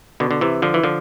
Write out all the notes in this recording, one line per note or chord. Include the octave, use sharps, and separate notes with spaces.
B2 D3
D3
C3 E3
D3 F3
E3
D3 F3